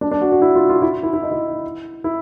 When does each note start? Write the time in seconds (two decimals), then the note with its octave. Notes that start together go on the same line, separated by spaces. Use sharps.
0.01 D4
0.11 D4
0.21 F#4
0.32 F#4
0.42 E4
0.55 F4
0.69 F4
0.82 E4
1.03 E4
1.13 E4
1.23 D#4
1.31 E4
2.04 E4